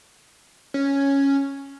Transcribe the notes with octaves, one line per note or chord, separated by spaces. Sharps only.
C#4